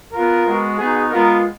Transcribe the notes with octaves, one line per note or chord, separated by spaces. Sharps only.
B3 F4 A#4
G#3 B3 F#4
B3 D#4 F#4 G#4
G#3 B3 F4 A#4